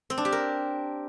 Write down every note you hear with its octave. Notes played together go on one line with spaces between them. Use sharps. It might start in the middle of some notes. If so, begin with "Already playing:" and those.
C4
D4
G4
A#4